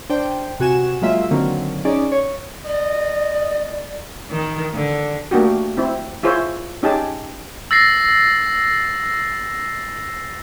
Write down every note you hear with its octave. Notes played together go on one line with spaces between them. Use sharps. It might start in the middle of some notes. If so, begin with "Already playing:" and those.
D4 C5 G5
C3 F#4 G#5 E7
F#3 G#3 A#3 F4 E5
D3 D#3 F#3 A#3 C4
C#4 D#4 G#4 D5
C#5
D5 D#5
D#3
D3
A3 A#3 D4 F#4 G4
C4 E4
E4 F4 G#4 C5 C#5 E5
C#4 D#4 G4 G#4 A5
E6 A6 A#6 C7